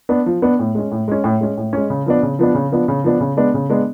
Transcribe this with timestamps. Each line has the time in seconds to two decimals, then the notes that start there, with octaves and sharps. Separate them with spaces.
0.09 B3 D4
0.26 F3
0.42 B3 D4
0.59 A2
0.75 G#3 C#4
0.91 A2
1.08 G#3 C#4
1.24 A2
1.41 G#3 C#4
1.57 A2
1.73 G#3 C#4
1.90 C#3
2.06 F3 B3 D4
2.23 C#3
2.39 F3 B3 D4
2.55 C#3
2.72 F3 B3 D4
2.88 C#3
3.04 F3 B3 D4
3.20 C#3
3.37 G#3 B3 D4
3.54 C#3
3.70 G#3 B3 D4